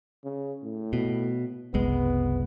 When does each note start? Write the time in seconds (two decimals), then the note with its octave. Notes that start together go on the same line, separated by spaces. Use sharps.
0.24 C#3
0.63 A2
0.93 B2
1.74 F#1 C2 G#3 B3